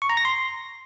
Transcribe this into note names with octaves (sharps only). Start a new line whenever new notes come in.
C#6
A#5
A#6
C6